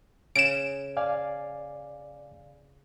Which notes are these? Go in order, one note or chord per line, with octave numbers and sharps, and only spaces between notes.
C#3 D7 E7
D5 F5 G#5